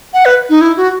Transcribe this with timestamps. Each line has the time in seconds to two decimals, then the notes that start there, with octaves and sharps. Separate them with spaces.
0.14 F#5
0.25 B4
0.50 D#4
0.61 E4
0.77 F#4